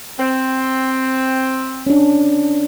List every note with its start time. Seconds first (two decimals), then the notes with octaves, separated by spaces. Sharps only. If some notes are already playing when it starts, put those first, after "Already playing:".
0.19 C4
1.87 C#4 D4